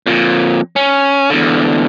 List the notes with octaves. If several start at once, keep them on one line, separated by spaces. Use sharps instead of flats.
F2 A#2
C#4
E2 D3